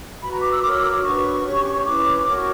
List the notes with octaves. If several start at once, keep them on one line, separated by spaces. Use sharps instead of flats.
F#4 B4 B5
A#5
D6
E6
F#4 A#4 C#5 D6
E6
D6
D6
D4 F#4 B4 C#6
C#4 G4 C#5
C#4 E4 B4 D6
F#4 A#4 C#5 D6
C#6